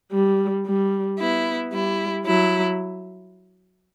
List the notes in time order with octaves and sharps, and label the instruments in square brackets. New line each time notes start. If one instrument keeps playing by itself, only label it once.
[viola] G3
G3
[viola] B3 [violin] E4
[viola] G3 [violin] E4
[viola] F#3 [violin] E4